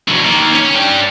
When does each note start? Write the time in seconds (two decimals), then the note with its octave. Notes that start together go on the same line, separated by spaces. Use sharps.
0.08 D3 F#3
0.24 D#3 A#3
0.53 C#4
0.75 D4 G5